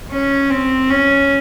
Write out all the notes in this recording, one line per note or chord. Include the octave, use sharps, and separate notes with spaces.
C#4
C4
C#4